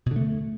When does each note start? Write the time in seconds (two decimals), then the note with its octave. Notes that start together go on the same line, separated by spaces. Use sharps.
0.06 B2
0.11 D3
0.16 A3